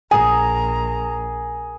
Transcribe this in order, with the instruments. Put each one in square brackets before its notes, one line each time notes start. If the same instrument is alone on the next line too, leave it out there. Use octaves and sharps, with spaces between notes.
[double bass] A#1 [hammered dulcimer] G#4 A#4 [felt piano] G#5 [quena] A#5